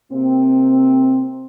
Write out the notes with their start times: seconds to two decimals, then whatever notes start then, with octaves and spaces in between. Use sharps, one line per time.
0.13 C3 A#3 C4